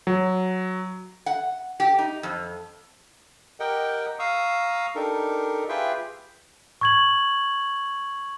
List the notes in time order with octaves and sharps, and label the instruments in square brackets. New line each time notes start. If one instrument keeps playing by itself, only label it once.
[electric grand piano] F#3
[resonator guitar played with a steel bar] F#5
G4
D#4
F2
[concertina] G4 A#4 D#5 F#5 G5
F5 A#5 C#6 D#6 E6
D4 D#4 G4 A4 A#4
F4 G4 G#4 B4 E5 G5
[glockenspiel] C#6 G#6 F#7